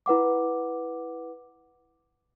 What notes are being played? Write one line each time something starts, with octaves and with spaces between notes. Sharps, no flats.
E4 B4 F#5 D6